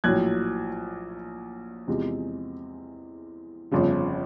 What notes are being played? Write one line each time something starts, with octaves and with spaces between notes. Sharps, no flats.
A#1 A2 F#3 F#6 G#6
E2 C3 F3 G#3
G1 F2 C#3 F3